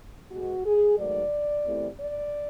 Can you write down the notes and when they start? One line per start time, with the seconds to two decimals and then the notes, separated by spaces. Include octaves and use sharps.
0.31 B2 G#3 F#4
0.65 G#4
0.98 G#2 D#3 F#3 A3 D5
1.64 E2 C3 E3 A3
1.98 D5